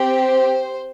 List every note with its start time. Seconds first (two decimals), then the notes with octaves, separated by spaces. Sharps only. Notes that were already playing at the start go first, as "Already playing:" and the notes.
Already playing: C4 G4
0.22 C5